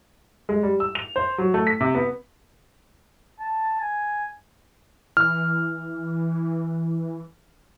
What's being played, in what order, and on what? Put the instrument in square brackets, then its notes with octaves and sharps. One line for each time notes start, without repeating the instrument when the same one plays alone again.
[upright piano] G#3
G3
E6
F7
C5
F#3
A3
B6
C3
B3
[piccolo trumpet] A5
G#5
[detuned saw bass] E3 [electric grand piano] F6